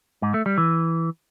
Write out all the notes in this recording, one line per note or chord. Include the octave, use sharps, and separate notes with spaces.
G#2
A3
G3
E3